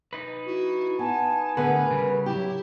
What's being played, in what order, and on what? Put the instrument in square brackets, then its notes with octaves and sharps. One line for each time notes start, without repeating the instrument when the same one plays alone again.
[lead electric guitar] D#4 B4
[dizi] E4 [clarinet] F#4
[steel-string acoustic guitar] B3 [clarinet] G#5 [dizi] A5
[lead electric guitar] D3 A3 [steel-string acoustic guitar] B3 G#4 B4 [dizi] A#4
[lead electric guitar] C#3 G3
[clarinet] F#3 [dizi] E4 [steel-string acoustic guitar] G4